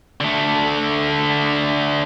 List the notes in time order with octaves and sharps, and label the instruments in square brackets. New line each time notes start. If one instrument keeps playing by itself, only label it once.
[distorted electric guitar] D3 A3